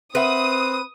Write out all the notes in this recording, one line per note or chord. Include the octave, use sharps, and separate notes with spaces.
C4 A#4 B4 E5 F#5 D#6